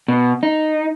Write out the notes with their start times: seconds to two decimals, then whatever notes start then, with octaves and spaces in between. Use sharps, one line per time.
0.08 B2
0.43 D#4